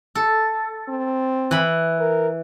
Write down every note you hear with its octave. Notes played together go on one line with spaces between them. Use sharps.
A4
C4
E3 B5
A#4